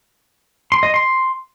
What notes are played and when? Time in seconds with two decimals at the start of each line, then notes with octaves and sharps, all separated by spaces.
0.72 C6
0.83 D#5
0.94 C6